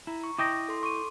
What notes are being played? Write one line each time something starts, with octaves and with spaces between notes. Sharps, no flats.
E4 A#5
C#6
E4 D#5 G5 D6 D#6 A#6
A4 C6
C#6 D6 D#7